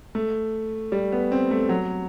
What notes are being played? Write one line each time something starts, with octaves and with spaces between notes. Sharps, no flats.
A3
G3
B3
C4
A3
F#3